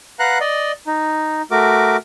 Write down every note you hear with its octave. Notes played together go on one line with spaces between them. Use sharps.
B4 F5 F#5 A#5 F#6
D5 D#5
D#4
A3 F#4 A#4 D6